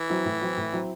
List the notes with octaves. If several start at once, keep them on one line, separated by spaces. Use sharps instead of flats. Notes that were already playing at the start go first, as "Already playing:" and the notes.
Already playing: E3
F#3 C4 E4
A2
F#3 C4 E4
A2
F#3 C4 E4